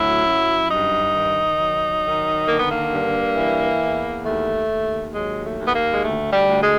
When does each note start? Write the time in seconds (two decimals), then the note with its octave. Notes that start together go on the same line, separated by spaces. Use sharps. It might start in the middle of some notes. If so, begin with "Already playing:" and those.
Already playing: D2 F#3 E4
0.26 F#2
0.71 G2 D#4
1.15 D#3
1.59 F#3
2.04 D#3
2.47 D3 A#3
2.59 B3
2.72 A#3
2.93 G2
3.36 E3
3.82 E2
4.26 D#2 A3
4.70 D#2
5.15 F#3 G#3
5.45 A3
5.59 D#2
5.68 B3
5.74 A#3
5.92 G#3
6.04 D2 A3
6.33 G3
6.48 D2
6.63 G#3